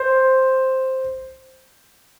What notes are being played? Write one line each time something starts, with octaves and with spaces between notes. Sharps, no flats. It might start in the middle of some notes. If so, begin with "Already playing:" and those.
Already playing: C5